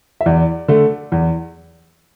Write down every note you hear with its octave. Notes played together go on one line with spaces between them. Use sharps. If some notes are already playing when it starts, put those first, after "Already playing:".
E5
E2 D5
D3 A3
E2